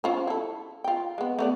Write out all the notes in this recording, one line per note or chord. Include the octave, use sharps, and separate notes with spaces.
C#4 F4 C5
E4 A4
F4 G5
G#3 B3
A3 B3 D5